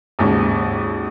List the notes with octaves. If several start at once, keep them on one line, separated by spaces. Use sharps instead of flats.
G#1 D#2 C#3